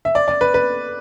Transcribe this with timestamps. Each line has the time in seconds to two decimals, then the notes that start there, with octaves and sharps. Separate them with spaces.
0.05 E5
0.15 D5
0.28 D5
0.41 B4
0.54 B4